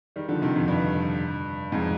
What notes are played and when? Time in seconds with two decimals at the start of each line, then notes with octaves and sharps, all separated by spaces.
0.16 D#3 G3
0.29 D3 F3
0.42 C3 D#3
0.55 F2
0.68 G2
1.72 F2 G#2